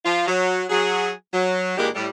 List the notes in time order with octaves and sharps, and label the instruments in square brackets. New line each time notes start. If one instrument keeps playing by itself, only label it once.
[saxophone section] F3 F4
F#3
F#3 G#4
F#3
A#2 E3 G#3 A#3 D4 G4
A2 G3